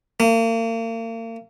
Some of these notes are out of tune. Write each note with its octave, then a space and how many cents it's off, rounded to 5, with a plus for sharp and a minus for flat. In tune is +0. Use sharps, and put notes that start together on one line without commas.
A#3 -40